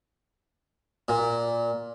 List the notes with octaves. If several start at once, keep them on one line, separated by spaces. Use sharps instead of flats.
A#2